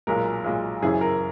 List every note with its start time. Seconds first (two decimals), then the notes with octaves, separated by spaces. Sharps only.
0.07 B1 A#2 G#3 A#4
0.44 B1 A#2 G#3
0.82 F#1 F#2 E3 G#4
1.01 A#4